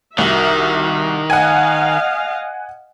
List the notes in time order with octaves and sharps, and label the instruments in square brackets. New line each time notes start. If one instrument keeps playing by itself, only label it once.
[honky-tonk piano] C2 [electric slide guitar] D#3 [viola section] F#4 A#4 E5
[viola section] D#5 F5 [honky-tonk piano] F#5 G#5